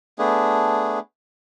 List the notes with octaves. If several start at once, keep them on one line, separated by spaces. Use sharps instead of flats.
A3 B3 D4 G#4